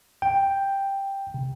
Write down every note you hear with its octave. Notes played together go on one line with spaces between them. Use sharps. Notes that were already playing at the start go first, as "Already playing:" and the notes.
G5
C3